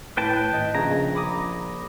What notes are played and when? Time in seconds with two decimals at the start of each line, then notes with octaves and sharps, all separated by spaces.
0.17 A2 B4 G5 A5
0.52 G#1 D#5
0.75 A#1 C#3 A#5 G#6
1.15 B5 D6 D#6